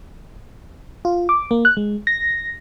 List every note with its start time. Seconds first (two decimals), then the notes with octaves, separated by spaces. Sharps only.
1.05 F4
1.29 D6
1.51 A#3
1.65 F#6
1.77 G#3
2.07 A#6